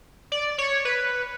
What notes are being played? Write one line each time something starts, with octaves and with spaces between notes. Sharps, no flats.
D5
C#5
B4